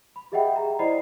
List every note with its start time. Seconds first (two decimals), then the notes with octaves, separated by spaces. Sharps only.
0.16 B5
0.32 G4 G#4 D#5 E5 F#5 G5
0.56 A#5
0.79 E4 C5 D5 D#5 B5 C7